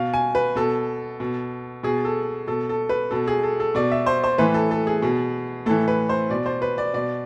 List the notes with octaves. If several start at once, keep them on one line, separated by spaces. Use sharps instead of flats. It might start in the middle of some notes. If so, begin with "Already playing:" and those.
Already playing: B2 F5
G#5
B4
B2 A4
B2
B2 G#4
A4
B2 A4
A4
B4
B2 A4
G#4
A4
A4
B2 D5
E5
C5
C5
A2 E3 B4
A4
A4
G#4
B2
A2 E3 A4
B4
C5
B2 D5
C5
B4
D5
B2 D5